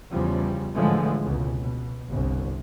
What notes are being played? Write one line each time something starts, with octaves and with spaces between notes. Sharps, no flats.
E2 C#3 F3 G3
A2 D3 E3 F3 G#3 A3
F1 C#2 B2
B2
G1 C2